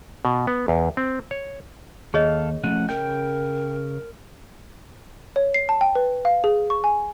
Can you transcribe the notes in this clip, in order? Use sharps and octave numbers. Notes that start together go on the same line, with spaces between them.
B2
B3
E2
C4
C#5
D#2 G#4 A4 C#5 D#5 F5
F3 A3 C#4 F#5
C#3 A#4 G5 G6
C#5
C7
A5
G5
B4
F5
G#4
C#6
G#5